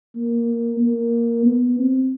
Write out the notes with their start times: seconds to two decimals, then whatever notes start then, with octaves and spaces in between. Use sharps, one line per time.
0.16 A#3
0.81 A#3
1.46 B3
1.79 C4